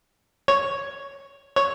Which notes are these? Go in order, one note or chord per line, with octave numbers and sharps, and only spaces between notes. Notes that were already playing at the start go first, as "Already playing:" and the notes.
C#5
C#5